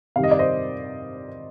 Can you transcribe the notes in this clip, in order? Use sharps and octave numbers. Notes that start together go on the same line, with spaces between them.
C3 D#3 G3 F5
D#5
D5
C5 D#5